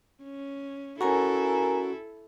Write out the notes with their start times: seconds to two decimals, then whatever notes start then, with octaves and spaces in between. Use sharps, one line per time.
0.23 C#4
1.01 C#4 E4 F#4 A4 A#4 G#5 A#5